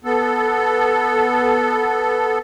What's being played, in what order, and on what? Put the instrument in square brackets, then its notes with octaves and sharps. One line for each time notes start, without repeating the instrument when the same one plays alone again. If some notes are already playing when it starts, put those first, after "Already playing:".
[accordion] B3 A4